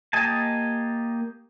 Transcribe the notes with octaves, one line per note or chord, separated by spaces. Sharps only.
A#3 G4 D#5 G#5 A5